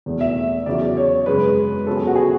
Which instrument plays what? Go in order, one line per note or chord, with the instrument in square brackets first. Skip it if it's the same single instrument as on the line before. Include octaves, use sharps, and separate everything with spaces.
[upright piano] E2 B2 A3
E5
E2 C#3 F#3 D5
C#5
F#2 C#3 G#3 B4
C#3 F#3 B3 A4
G#4
F#4
G#4